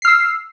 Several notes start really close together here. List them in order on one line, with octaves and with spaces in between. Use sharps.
C7 F6 E6